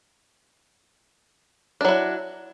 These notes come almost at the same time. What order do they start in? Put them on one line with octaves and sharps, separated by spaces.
D4 F#3 E4